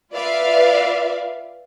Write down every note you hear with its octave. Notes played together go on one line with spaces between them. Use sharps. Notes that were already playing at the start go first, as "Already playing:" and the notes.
F4 B4 D5 E5 F5